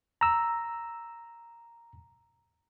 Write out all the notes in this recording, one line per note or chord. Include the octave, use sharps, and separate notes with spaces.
A#5 E6